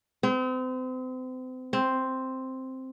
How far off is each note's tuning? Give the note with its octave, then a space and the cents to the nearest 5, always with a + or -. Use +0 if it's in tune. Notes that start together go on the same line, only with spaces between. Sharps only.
C4 -35
C4 +0